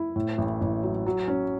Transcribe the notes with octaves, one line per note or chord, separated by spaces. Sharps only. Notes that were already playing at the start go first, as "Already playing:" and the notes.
Already playing: E4
A2
A1
A1
F#3
F#3
C#4